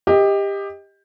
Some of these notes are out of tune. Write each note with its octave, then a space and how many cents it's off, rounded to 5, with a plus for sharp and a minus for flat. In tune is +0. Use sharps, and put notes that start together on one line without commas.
G4 +20 D#5 +15